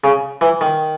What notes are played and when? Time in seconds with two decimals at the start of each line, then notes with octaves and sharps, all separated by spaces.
0.04 C#3
0.41 E3
0.61 D#3